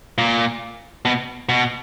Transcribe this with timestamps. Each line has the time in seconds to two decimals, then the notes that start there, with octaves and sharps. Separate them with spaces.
0.18 A#2
1.05 B2
1.49 B2